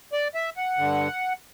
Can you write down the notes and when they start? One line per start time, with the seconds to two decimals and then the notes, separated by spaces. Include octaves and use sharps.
0.13 D5
0.35 E5
0.57 F#5
0.78 G2 D3